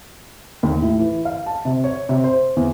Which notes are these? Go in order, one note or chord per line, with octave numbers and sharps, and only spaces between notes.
D#2
A2
E3
F5
A5
C3
C#5
C3
C5
E2